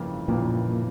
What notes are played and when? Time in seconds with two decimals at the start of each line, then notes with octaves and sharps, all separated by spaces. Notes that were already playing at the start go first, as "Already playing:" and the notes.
Already playing: G1 F2 C#3 E3 A#3
0.28 G1 F2 A#2 C#3 E3 A#3